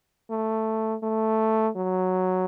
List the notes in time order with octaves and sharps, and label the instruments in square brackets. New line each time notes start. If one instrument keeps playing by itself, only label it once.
[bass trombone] A3
A3
F#3